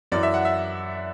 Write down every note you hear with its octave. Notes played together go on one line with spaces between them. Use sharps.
F#2 E3 D5
E5
F#5
E5